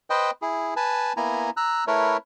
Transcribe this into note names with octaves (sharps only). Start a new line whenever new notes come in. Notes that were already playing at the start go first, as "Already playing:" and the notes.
B4 C5 D#5 G5
E4 G#4
B4 G#5 A5
A#3 B3 E4 G#5 A#5
A#5 E6 F#6
A3 E4 A#4 B4 C#5